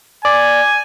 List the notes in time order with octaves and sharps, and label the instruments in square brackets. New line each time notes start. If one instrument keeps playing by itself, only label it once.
[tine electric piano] D5 [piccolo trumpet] G#5